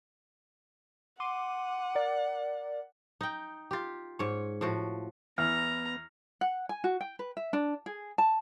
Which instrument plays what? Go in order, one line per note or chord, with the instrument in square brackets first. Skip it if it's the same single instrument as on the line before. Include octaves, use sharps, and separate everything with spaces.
[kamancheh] F#5 [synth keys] C6 D6 D#7
[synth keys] A#4 D5
[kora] D#4 G5
F4 G4
G#2 C#5
A2 F3 F#4
[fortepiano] E2 [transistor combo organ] B3 [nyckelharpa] A#5 [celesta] F6
[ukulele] F#5
G#5
F#4
G5
B4
E5
D4
G#4
A5